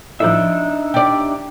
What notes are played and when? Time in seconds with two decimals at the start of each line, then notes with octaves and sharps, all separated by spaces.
0.20 A2 F3 D4 D#4 E5
0.94 G4 D5